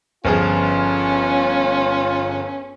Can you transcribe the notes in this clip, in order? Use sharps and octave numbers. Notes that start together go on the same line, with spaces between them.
G1 F3 C#4 F4 G#4